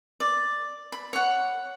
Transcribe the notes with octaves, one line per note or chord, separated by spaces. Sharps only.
D5
B5
C#5 F#5